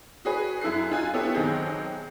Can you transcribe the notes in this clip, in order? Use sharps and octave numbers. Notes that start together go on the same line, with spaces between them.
F#4 G#4 B4
F#2 E4 A4 F#6 C7
D#4 F4 G#5 F#6
B3 E4 G4 A4 C#5
B1 D#3 C4 G#4 G6